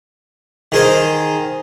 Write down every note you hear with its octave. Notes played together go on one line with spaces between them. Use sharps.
D#3 G#4 C5